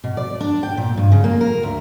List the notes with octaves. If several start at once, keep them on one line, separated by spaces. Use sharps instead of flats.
B2
D5
D4
G5
A#2
G2
C#3
A#3
A#4
D2